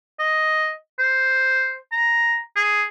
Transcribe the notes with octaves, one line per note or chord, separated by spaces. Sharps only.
D#5
C5
A#5
G#4